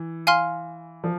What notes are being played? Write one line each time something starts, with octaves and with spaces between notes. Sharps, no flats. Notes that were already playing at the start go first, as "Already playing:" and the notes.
Already playing: E3
F5 G#5 C6 F6
F3